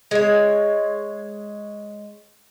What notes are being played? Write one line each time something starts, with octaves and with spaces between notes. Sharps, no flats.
G#3 C#5